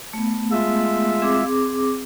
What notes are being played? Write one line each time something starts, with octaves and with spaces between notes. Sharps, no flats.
A3 B3
G#3 F4 E5
C4 G#4 D6